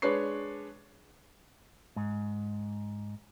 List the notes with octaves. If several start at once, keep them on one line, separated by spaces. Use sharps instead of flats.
G#3 D4 B4 C#5 C#6 C7
G#2